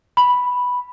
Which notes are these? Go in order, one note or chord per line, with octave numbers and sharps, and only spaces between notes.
B5